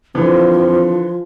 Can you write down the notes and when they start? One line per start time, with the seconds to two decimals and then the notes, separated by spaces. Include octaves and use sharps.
0.15 D3 E3 F3 C4